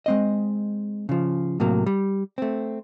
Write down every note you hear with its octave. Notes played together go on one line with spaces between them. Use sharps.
G#3 C4 D#5
C#3 F3
A2 C3 F#3 A#3
G3
A3 C4